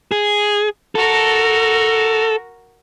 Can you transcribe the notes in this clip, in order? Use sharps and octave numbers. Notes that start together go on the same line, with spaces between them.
G#4
F#4 A4 A#4